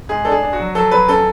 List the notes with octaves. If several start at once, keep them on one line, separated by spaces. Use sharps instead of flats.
G#2 G#4
D4 A4
G#4
D4
F#4
F#3
F#3 A4
F#3 B4
C#3 A4